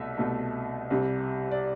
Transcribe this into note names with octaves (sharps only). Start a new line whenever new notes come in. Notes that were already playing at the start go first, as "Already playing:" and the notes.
Already playing: C2 B2 A3 E5
C2 B2 A3
C2 C3 G3
D5